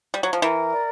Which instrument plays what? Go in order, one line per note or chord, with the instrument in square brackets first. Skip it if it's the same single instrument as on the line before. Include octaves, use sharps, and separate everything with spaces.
[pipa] G3
F#3
F3
[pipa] E3 [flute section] A#4
[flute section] D5